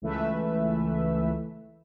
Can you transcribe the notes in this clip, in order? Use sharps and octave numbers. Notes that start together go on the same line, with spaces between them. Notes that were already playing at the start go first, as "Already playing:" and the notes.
C#2 E3 A3 B4 E5